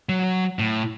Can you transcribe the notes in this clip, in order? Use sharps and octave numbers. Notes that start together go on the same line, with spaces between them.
F#3
A2